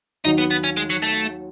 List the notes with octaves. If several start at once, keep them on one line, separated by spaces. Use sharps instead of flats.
D#2 D#3 F#3 D#4
B3
B3
C#4
G#3
F#3
A3